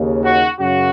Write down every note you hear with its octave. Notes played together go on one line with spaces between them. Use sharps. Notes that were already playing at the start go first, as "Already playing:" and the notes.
Already playing: D#2 C#3
F#4
F#2 C#3 F#4